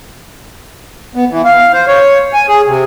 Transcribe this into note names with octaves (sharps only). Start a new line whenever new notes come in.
B3
E3
F5
C5
C#5
G#5
G#4
C3